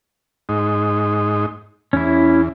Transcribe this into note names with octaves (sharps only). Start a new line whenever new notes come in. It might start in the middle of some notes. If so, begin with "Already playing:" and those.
G#2 D#4
E2 C#4 E4